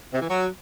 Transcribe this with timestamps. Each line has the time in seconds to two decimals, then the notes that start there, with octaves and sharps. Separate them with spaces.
0.12 C3
0.20 E3
0.28 F#3